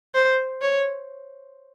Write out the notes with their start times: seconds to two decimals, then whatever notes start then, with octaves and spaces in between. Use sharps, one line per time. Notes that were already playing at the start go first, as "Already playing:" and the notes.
0.14 C5
0.61 C#5